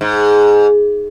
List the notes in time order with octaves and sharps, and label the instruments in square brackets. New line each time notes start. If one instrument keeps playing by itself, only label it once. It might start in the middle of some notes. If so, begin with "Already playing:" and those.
[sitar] G#2